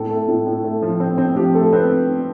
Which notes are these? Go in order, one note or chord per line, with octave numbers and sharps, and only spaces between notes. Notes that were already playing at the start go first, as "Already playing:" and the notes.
Already playing: A2 A4
A3
A2
A2
A3
F3
C4
C4
F3 G4
A3 A4
C4 B4